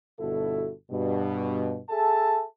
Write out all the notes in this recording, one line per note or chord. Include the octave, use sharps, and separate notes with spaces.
G1 B2 E4 F#4 A4
G2 B2
G#4 A4 E5 G#5 A5